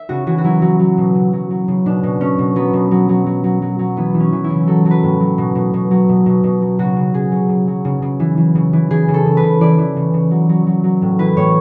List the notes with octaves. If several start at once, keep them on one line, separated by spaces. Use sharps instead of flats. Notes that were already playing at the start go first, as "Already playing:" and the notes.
Already playing: E5
C#3 F#4
E3 F#4
F#4
F#3 E4
F#3
F#3
B2
C#3
F#3
F#3
C#3
B2 D4
B2
B2 C#4
B2
F#3 B3
B2
F#3
F#3
F#3
F#3
F#3
F#3
E3 B3
E3
C#4
E3
E4
C#3
F#3 A4
F#3
B4
A2
F#3
B2
B2
B2
F#3
B2
B2
B2
F#3
C#3 F#4
C#3
C#3 G#4
F#3
C#3
F#3
C#3
C#3
E3
E3
C#3
E3
E3 G#4
C#3
A4
C#3
B4
C#3
E3 D5
E3
C#3
C#3
F#3
F#3
F#3
F#3
A2
E3 B4
A2 C#5